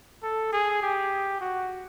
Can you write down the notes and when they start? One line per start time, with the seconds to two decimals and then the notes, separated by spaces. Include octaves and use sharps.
0.23 A4
0.53 G#4
0.82 G4
1.41 F#4